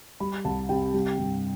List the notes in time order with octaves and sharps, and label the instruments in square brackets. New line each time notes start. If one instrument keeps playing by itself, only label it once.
[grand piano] G3 B5
C2 A5
C3 G5
G3
G2